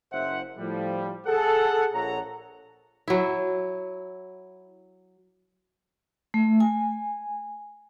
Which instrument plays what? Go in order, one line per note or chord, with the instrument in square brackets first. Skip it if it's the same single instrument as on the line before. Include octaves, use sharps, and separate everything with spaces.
[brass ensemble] F#1 C5 E5 F#5
A2 F3 G3
G#4 A4 F#5
A#1 A#2 A4 C#5 F#5 A#5
[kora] F#3 E4
[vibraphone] A3
G#5